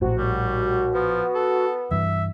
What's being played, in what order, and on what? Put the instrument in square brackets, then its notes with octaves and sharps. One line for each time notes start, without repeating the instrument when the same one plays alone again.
[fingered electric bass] A#1 A2 [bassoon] C3 [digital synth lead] F#4
[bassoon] D#2 [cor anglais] G3
[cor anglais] F3 [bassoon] B3
[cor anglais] A4
[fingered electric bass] G2 E3 [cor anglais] E5